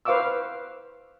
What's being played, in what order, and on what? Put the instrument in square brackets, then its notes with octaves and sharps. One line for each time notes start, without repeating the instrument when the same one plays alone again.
[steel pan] B4 C5 F5 C#6 D6 E6